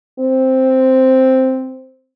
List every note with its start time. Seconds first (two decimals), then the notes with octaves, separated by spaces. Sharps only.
0.19 C4